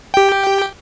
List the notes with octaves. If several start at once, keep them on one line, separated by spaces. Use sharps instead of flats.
G4 G5